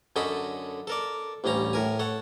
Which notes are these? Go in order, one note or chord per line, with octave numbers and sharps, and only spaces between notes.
F#2 D3 C#4 A4 D#5 B5
A4 A#4 D5
A1 D2 G3 C#4 A#5
A2 A#4 G#5
A4 C#5 F#5